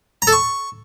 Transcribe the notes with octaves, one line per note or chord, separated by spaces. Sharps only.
A#5
A4
C#6